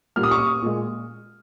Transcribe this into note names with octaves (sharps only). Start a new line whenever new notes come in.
A#2 G3 A#3 F6
D#6
C#6
D#6
A#2 G#3